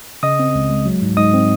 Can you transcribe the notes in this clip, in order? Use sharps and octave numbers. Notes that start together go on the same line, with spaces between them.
C#3 D#5 D#6
C4
C#2
G#3
F#3
G#2
G#2 D#5 D#6
C4